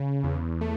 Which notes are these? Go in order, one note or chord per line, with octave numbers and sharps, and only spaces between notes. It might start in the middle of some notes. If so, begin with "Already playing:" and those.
Already playing: C#3
E2
A3